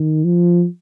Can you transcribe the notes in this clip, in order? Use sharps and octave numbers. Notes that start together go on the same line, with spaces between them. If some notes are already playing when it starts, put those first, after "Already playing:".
Already playing: D#3
F3